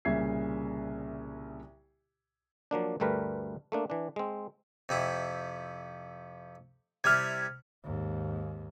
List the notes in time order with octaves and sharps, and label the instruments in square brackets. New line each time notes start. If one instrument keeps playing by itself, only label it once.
[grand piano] C2 A#2 C#3 E5 G#6 C7
[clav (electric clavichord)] F3 F#3 A#3 D4
D2 G2 G3 A3 A#4 B4
A3 A#3 D4
E3 D4
G#3 C4
[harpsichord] F2 C3 E4
[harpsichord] C3 G3 E4 [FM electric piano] F6 G#6
[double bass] D#2 G#2